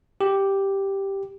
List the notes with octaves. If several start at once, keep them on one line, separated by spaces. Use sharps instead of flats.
G4